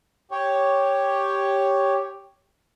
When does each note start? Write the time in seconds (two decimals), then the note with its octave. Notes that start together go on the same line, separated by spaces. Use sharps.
0.31 G4 C#5